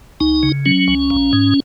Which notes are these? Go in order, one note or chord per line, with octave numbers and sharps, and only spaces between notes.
C#2 D#4
C#3
F#3 C#4
C#2
A#1
G#2